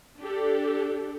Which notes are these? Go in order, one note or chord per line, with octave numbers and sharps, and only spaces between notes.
D4 G4 A4